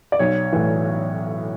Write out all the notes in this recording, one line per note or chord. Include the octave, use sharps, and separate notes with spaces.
D5
B1 C#5
A2 E3